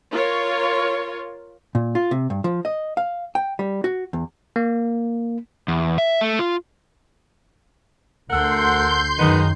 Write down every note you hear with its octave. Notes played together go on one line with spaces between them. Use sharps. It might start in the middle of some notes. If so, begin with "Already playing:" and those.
F4 A#4 C#5
A#2
F4
C3
G2
F3
D#5
F5
G5
G3
F#4
E2
A#3
E2
E5
A3
F4
D2 A4 A#4 F#5 C6 G6
F#2 D#3 G#3 B3 D#4